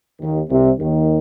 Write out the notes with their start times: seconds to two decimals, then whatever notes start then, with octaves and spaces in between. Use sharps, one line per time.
0.21 D#2 D#3
0.50 C2 C3
0.79 D#2 D#3